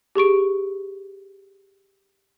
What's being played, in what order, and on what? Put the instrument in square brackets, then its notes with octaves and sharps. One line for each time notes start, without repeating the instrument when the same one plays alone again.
[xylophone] G4 G#4 C#6 D7